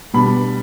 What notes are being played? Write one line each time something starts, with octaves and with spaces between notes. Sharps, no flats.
B2 G3 B3 D4 B5